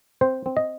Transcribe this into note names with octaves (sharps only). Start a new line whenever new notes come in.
C4 C5
C4
D#5